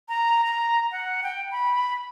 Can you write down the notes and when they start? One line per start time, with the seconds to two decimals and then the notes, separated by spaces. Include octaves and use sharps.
0.09 A#5
0.44 A#5
0.92 F#5
1.23 G5
1.52 B5